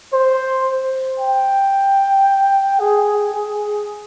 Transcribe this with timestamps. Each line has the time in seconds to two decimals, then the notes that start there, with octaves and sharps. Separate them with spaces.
0.13 C5
1.20 G5
2.80 G#4
3.34 G#4